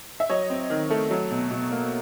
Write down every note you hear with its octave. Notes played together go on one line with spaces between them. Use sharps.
E5
F#3 C#5 D#5
C4
D#3
A3
F#3
B2
B2
A#3